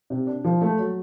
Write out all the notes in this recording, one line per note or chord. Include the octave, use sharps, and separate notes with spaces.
C3
D4
F3
A3
F#3